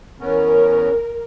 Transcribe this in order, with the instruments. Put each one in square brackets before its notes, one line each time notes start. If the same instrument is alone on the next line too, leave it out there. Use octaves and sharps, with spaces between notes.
[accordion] E2 B3 C#4 [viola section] A#4